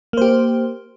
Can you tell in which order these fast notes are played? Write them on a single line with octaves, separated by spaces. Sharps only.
A#3 C5 G4